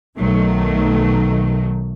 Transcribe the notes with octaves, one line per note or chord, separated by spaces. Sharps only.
B1 D#3 F#3 A3